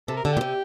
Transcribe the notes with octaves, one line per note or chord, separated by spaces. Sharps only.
C3 A4
A#4
D3 A4
A#2 G4
C3